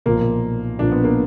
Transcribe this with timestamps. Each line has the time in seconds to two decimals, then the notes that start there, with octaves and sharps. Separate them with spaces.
0.06 B1 A#2 F3 A#3
0.79 B1 A#2 F3 D4
0.92 B3
1.04 A#3